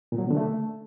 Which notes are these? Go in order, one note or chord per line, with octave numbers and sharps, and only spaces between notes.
A#2
F#3
B2
D3
A3